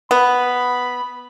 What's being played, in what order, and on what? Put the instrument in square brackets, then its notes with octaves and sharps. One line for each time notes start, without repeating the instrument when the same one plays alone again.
[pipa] B3 [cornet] B5